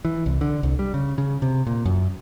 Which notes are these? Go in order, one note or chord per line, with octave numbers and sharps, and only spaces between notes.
E3
C2
D3
C2
G3
C#3
C#3
C3
A#2
F#2